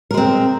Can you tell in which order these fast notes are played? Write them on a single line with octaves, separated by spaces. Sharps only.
A#4 G#3 C4